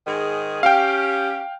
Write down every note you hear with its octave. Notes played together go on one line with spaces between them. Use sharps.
G#2 D#3 G#4
C#4 G4 F5 G5